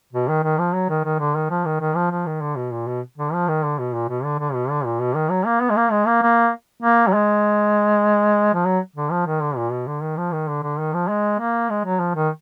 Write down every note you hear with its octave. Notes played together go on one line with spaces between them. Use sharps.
B2
D#3
D#3
F3
F#3
D#3
D#3
D3
D#3
F3
D#3
D#3
F3
F3
D#3
D3
B2
A#2
B2
D3
F3
D#3
D3
B2
A#2
B2
D3
D3
B2
D3
A#2
B2
D#3
F#3
A#3
B3
G#3
A#3
G#3
A#3
A#3
A#3
F#3
G#3
F3
F#3
D3
F3
D#3
D3
A#2
B2
D3
D#3
F3
D#3
D3
D3
D#3
F3
G#3
A#3
G#3
F#3
F3
D#3